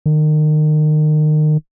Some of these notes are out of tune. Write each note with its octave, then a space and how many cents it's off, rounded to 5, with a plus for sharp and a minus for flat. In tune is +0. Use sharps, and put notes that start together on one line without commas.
D#3 -30